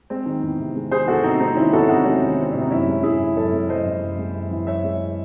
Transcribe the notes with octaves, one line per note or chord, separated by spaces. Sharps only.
G#3 C4
D#3
E2
C3
G#3
D#3 G#4 C5
E2 F#4 A4
C3 C4 D#4
G#3 C4 D#4
D#3 C#4 E4
E2 F#4 A4
C3 D#4 F#4
G#3 C#4 E4
D#3
E2 C4
C3 C#4
D#4
F#2 C#4 E4
G#3
F#2 E4 G#4
E3
F#2 A4 C#5
G#3
F#2 C5 D#5
E3
F#2
G#3
F#2
E3
F#2 C#5 E5
G#3